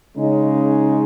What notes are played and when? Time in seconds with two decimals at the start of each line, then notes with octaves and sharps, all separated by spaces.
0.18 C#3 G#3 D#4